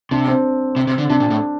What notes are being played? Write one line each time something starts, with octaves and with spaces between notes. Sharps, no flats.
C3 D4
C4
C3
C3
D3
C3 D4
A#2
A2